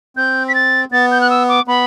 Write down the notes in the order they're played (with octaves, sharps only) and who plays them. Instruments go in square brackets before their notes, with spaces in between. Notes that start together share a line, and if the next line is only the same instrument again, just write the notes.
[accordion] C4 [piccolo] G6
[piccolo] B6
A6
[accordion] B3 [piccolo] A6
[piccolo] G6
F#6
E6
D6
[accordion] B3 [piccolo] B5